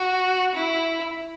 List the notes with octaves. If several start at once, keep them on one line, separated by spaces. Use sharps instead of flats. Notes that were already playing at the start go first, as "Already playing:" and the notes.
Already playing: F#4
E4